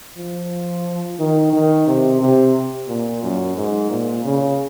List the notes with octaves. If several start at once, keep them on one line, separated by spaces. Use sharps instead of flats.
F3
D#3
D#3
C3
C3
A#2
F#2
G#2
A#2
C#3